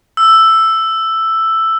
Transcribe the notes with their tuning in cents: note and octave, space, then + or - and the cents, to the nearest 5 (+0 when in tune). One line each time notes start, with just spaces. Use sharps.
E6 +5